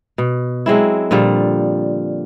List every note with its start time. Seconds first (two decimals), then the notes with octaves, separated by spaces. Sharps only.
0.18 B2
0.66 F#3 G#3 C4 E4
1.11 A#2 D3 F3 G3